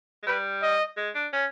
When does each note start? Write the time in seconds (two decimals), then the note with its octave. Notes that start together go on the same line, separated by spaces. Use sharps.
0.23 G#3
0.27 G3 B4
0.62 D#5
0.97 G#3
1.15 D4
1.33 C#4